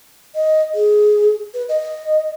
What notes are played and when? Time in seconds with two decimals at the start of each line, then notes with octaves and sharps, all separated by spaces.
0.35 D#5
0.75 G#4
1.54 B4
1.69 D#5